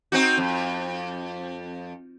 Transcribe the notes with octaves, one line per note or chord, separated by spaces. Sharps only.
C4 D#4 F#4
F2